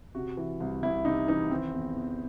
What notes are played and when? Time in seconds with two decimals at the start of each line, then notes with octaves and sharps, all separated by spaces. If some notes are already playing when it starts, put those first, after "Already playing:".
0.15 C3 F#4
0.37 E3
0.60 C2
0.83 C2 E4
1.05 C3 D#4
1.28 E3 D#4
1.50 D#3 C4
1.73 E2
1.95 E2